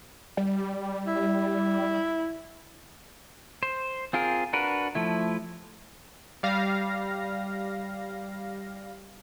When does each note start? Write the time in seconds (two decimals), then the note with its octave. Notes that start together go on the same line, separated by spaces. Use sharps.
0.37 G3
1.07 E4
3.63 C5
4.13 C4 F4 G#4 A#4
4.53 D4 F#4 A#4 B4
4.95 F3 A3 E4
6.43 G3 F5 A#6